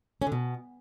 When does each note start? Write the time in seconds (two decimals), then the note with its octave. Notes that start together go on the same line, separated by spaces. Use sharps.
0.22 C#4
0.27 D3
0.32 B2